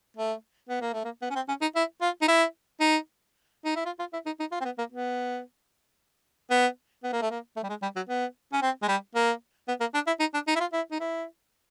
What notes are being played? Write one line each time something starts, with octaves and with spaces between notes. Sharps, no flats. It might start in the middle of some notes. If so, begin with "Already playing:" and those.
A3
B3
A#3
A3
A#3
B3
C#4
C4
C#4
D#4
E4
F4
D#4
E4
D#4
D#4
E4
F4
F4
E4
D#4
D#4
F4
C4
B3
A#3
B3
B3
B3
A#3
A3
A#3
A3
G3
G#3
G3
F#3
B3
C#4
C4
G#3
G3
A#3
B3
A#3
D4
E4
D#4
D4
D#4
E4
F4
E4
D#4
E4